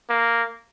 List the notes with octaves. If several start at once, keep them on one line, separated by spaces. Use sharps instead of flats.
A#3